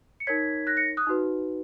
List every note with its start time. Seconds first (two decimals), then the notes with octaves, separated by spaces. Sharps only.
0.20 C#7
0.27 D#4 A#4 C#5 G#6 B6
0.67 F#6 A#6
0.77 A#6 C#7
0.97 D#6 F#6
1.07 D#4 F#4 B4